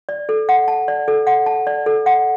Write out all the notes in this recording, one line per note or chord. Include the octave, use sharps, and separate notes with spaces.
D5
A4
F#5
A5
D5
A4
F#5
A5
D5
A4
F#5